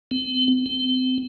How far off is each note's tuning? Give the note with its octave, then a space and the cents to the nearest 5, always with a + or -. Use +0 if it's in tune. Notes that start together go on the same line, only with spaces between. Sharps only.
C4 -40
C4 -30